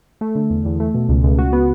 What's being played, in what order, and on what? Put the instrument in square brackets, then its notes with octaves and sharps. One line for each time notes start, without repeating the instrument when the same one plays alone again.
[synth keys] A3
D3
E2
E2
A3
B2
C#2
C#2
F#4
B3